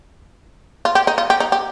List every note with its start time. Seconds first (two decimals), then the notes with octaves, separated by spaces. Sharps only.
0.85 F4
0.95 G4
1.07 D#4
1.18 F4
1.30 G4
1.40 D#4
1.52 G4